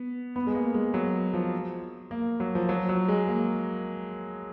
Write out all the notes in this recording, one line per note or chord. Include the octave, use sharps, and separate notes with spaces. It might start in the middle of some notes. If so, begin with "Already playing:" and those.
Already playing: B3
B3
G#3
A#3
G#3
F#3
F3
A#3
F#3
F3
F#3
F#3
G#3
A#3